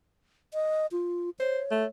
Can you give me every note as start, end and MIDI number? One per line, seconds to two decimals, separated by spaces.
0.54 0.86 75
0.92 1.30 65
1.40 1.61 72
1.40 1.88 73
1.71 1.85 57